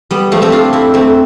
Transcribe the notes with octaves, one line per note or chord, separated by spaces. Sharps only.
G3 B3
F3 A3
A3 C4
D4 F4
C4 E4
A3 C4